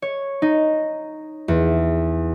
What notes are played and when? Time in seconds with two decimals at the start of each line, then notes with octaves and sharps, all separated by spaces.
0.02 C#5
0.42 D#4
1.48 E2